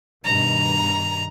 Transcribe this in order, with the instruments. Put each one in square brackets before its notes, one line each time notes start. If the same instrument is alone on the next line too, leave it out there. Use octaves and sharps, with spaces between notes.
[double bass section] G2 B2 D#3 [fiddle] A#5